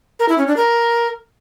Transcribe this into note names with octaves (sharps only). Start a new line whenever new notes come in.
A#4
E4
C#4
D4
A#4